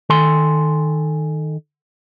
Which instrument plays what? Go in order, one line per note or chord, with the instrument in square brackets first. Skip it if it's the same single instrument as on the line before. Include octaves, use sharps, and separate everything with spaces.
[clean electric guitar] D#3 A4 G#5 C6